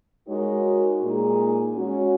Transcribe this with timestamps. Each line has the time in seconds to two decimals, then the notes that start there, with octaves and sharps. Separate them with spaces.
0.28 G#3 D#4 F#4 A#4 C#5
1.02 A#2 G#3 D#4 G#4
1.74 G#3 C#4 F#4 C#5